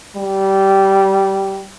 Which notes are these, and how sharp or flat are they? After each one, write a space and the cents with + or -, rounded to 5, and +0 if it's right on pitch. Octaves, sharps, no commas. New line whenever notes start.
G3 -15